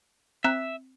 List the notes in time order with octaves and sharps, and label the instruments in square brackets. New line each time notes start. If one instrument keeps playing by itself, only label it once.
[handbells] C4 A#5 F#6 [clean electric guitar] E5